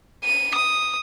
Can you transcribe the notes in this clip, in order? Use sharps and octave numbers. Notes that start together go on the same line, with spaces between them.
D#7
D#6